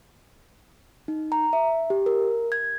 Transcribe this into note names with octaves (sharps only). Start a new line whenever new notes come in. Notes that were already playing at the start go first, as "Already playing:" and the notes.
D#4
A#5
E5
G4
A#4
G#6